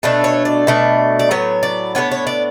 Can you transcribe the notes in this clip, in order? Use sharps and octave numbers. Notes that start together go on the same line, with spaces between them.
B2 A3 D4 B4
C#5
D5
B2 A3 D4
D5
A2 F#3 B3 C#5
D5
A2 F#3 B3 D4 C#5
C#5
D5